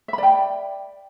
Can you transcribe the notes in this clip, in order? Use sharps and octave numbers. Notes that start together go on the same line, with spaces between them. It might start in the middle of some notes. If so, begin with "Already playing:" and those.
D5 E5 G5 B5